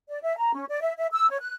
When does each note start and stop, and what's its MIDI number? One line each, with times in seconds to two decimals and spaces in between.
0.09 0.21 74
0.22 0.34 76
0.37 0.54 82
0.55 0.65 61
0.68 0.80 74
0.81 0.93 76
0.97 1.07 76
1.12 1.29 88
1.29 1.37 73
1.40 1.54 90